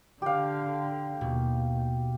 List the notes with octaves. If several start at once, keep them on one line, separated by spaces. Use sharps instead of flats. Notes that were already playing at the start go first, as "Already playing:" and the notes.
D3 G4 F5
D#2 B2